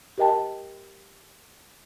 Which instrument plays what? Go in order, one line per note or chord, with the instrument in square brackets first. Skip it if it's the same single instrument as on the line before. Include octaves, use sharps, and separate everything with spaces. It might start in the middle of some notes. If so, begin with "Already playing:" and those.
[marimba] G4 A#4 D#5 G5 A5